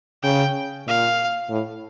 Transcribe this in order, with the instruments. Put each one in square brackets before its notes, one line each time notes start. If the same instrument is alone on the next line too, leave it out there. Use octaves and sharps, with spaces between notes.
[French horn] C#3 [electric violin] G5
[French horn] A#2 [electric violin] F5
[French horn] A2